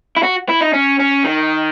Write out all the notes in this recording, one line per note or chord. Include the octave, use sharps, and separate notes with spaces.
E4
F#4
E4
D#4
C#4
C#4
D#3